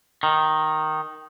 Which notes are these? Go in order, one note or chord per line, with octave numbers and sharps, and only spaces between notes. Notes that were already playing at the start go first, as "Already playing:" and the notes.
D#3